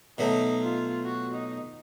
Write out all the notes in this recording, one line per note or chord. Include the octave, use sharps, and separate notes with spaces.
B2 F#3 A3 D#4
F4
F#4
D#4